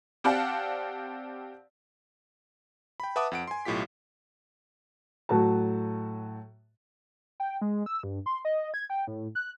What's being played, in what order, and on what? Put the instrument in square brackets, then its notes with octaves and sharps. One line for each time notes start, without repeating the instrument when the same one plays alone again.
[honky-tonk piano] C4 G4 D5 F5 F#5 A5
[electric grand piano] G5 B5
B4 E5 F#5 A5 D6 D#6
F2 F#5 D7
G#5 C6
B1 A2 F4 G4 B6
[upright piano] A2 F#3 F#4 A5
[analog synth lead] G5
G#3
E6
G2
C6
D#5
G#6
G5
A2
F#6